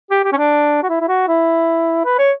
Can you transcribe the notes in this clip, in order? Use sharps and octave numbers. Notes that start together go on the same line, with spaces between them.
G4
G4
C#4
D4
F#4
E4
E4
F#4
E4
B4
C#5